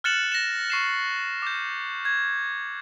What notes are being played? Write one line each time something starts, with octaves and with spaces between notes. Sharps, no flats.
F6 F#6 A6 C#7 E7 F#7
A#6 E7
C#6 C7 E7
D6 G6
G#6